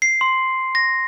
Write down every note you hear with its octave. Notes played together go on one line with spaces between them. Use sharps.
C7
C6
A#6